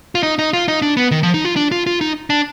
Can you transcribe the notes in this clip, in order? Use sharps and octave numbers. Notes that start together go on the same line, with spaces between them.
F4
D#4
D#4
F4
D#4
D4
B3
D#3
F3
D#4
F4
D4
F4
F4
D#4
D4